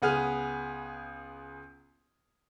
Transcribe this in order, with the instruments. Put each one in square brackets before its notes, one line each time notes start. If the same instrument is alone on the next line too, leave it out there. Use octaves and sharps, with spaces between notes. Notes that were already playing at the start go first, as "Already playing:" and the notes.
[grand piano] C#2 B3 G#4 F6